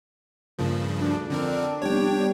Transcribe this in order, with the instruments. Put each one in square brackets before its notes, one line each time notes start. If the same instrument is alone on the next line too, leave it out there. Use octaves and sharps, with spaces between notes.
[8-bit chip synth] G2 C#3 F3 [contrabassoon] A#2
[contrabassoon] D2 [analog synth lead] D4
[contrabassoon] F2 [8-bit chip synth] D3 C4 A#4
[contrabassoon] F1 [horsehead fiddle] G3 B3 [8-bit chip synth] C#5 G5